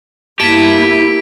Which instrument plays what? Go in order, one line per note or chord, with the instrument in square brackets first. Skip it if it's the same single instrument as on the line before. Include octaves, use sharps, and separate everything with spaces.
[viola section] A#3 B3 E4 [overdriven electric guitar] G4 A5 [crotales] B6 D7